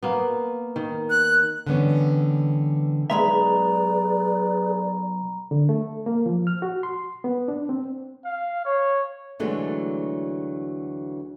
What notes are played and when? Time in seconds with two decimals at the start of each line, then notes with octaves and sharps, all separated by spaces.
0.03 A#3 B3
0.76 D#3
1.10 F#6
1.67 D3 E3 G3 B3 C#4
3.10 B1 G#3 G#4 B4 D5 E5 A#5 B5
5.51 D3
5.69 A3
6.06 A#3
6.26 F3
6.47 F6
6.62 F#4
6.83 C6
7.24 B3
7.48 D4
7.69 C4
8.25 F5
8.65 C#5
9.40 D2 E3 F#3 G#3 A3 D4